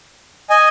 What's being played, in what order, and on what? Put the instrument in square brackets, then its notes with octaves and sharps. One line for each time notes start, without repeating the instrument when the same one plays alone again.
[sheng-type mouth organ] D#5 G#5